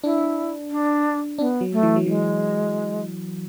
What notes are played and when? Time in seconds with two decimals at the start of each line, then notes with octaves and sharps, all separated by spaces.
0.03 D4 E4
0.71 D4
1.38 C#4 D4
1.41 B3
1.61 F#3
1.72 A3
1.83 E3
1.96 F#3
2.06 E3 G#3